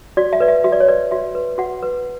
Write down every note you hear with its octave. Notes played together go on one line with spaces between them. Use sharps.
F#4 D5
E5
B4 D5
E5
F#4 E5
D5
C#5
B4 D5
F#4 E5
B4
F#4 F#5
B4